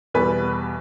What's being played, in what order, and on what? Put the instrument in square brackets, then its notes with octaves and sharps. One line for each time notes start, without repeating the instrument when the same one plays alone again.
[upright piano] E2 B2 G3 B4